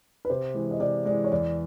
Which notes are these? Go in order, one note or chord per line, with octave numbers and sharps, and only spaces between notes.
B4
C3 C5
E3 G#3
D#5
C3 D5
E3 G#3 D5
C#5
E2 D5